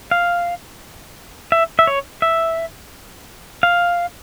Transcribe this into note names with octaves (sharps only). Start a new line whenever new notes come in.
F5
E5
E5
C#5
E5
F5